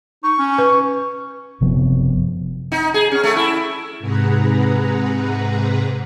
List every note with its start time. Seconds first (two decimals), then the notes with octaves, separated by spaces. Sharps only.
0.24 D#4 C#6
0.39 C#4
0.58 B4
1.61 F#1 C3 F3 B3
2.72 D#4
2.94 G#4
3.11 C#4
3.23 A3
3.36 E4
3.99 G#2 C3 G#4 B4 F#5 A#5